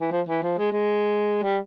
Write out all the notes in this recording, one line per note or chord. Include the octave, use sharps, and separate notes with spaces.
E3
F3
E3
F3
G#3
G#3
G3